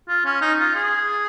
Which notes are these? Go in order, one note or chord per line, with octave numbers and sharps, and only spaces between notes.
F4
C#4
D#4
F4
G#4